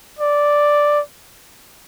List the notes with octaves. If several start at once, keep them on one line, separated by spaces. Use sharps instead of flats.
D5